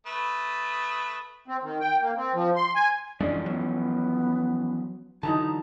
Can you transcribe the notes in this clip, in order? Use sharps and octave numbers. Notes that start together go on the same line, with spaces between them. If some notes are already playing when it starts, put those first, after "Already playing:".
A3 B4 D#6
C4
D#3
G5
A#3
C4
F3
C6
G#5
F#2 E3 F3 G#3 C#4 D4 D5
F#3 B3
D3 E3 F#3 D#4 A5 A#5